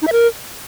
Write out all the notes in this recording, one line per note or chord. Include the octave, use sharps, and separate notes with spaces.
D#4
E5
A#4